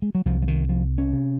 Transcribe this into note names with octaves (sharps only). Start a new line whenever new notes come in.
G#3
F#3
C2 C3 F3
F3
D#3
F3
C#4
C3